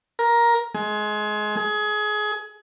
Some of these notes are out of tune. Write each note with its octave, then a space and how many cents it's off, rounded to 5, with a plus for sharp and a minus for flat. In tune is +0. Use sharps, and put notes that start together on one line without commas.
A#4 +15
G#3 +25
G#4 +25